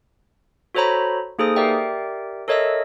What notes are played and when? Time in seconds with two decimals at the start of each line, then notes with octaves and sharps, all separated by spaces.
0.75 F#4 A4 C5 C#5 A#5 B5
1.39 A#3 D#4 G#4 A4 C5 D#6
1.56 G4 A#4 D5 E5 G5
2.48 A4 A#4 C#5 D#5 E5 E6